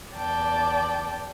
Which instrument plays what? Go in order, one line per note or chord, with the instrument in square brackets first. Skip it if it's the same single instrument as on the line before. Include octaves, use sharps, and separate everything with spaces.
[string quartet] E2 D5 G5 A5